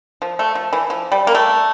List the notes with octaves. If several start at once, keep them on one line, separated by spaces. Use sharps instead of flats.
F3
A3
F3
E3
F3
G3
A#3
A3